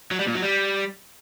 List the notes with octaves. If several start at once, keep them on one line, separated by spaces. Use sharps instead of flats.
F#3
G3
A#2
F#3
G3